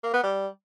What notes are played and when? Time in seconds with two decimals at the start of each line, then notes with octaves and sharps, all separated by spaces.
0.03 A#3
0.13 B3
0.23 G3